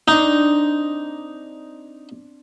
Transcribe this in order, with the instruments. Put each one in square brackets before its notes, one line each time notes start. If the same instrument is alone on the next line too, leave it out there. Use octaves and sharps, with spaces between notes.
[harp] C4 D4 [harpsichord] D#4